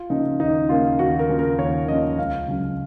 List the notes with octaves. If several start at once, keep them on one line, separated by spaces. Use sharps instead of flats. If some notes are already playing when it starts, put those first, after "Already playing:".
Already playing: F4
C#3 F3 A#3 C#4 D#4
D#2 D#4
C#3 F3 A#3 C#4 F4
D#2 F#4
A#4
C#3 F3 A#3 C#4
A#4
D#2 C#5
C#3 F3 A#3 C#4 D#5
C#2 F5
C#3 F#3 C#4